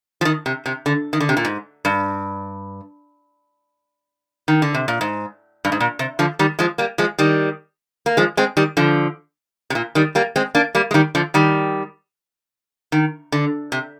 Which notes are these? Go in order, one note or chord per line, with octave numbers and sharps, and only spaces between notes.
F3
D#3
C3
C3
D3
D#3
D3
C3
A#2
G#2
G2
D#3
D3
C3
A#2
G#2
G2
G#2
A#2
C3
D3 F3
D#3 G3
F3 G#3
G3 A#3
F3 G#3
D#3 G3
A#3
F3 G#3
G#3 C4
D#3 G3
D3 F3
C3
A#2
D#3 G3
G3 A#3
G#3 C4
A#3 D4
G3 A#3
G#3
D#3 G3
D3 F3
D#3 G3
D#3
D3
C3